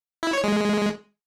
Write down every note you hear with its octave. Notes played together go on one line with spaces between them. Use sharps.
E4
C#5
G#3